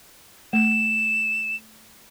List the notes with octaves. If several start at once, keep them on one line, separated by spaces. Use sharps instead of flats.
A3 E7